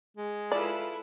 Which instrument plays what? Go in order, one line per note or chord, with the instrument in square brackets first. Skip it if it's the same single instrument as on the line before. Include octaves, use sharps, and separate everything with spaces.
[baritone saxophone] G#3
[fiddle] E4 A4 [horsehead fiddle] F4 B4 [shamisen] D5